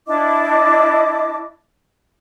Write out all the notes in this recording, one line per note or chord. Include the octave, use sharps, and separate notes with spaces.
D4 E4 D#5 D6